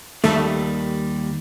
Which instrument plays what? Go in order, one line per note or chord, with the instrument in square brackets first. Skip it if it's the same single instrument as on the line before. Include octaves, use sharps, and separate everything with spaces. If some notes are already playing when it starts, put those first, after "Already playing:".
[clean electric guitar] D#2 D#3 G3 [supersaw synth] A3